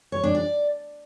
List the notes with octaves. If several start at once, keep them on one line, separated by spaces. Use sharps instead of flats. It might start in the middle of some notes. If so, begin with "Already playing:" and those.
C#5
D4
D5